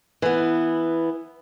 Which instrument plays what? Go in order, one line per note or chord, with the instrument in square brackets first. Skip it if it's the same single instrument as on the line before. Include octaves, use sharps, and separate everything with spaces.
[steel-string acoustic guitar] E3 B3